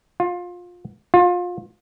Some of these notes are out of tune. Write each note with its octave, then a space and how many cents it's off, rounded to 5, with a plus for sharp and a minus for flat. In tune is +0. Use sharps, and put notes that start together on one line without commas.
F4 +20
F4 +25